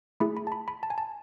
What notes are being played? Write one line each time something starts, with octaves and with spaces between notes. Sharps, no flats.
A3 E4 G#4 B5
B5
A5
B5
B5
A5
G#5
A5